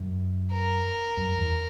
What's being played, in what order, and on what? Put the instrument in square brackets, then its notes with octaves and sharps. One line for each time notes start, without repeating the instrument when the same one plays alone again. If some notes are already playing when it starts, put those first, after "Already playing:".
Already playing: [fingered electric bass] F#2
[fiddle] A#4
[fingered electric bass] F#2
E2